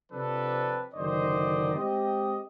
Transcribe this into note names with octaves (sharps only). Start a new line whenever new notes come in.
C3 F3 C4 D4 A4 B4
F#1 D3 D#3 C5 D5 D#5
G#3 C4 G4 D#5